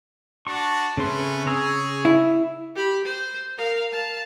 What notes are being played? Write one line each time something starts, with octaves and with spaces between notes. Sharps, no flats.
D4 F#4 A5 C#6
C#3 A3 C4 C#4 B4 C6
C#3 G#4 C#5 A#5 E6
E4
G4 B5
C5
A#4 F5
F5 A5